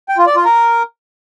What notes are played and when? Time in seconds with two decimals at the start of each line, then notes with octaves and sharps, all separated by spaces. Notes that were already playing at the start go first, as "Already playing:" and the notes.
0.09 G5
0.18 F4
0.27 D5
0.36 F4
0.45 A#4